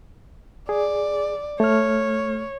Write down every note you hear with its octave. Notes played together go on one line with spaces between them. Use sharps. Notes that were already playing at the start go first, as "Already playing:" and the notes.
G#4 D5
A3 C#5 F6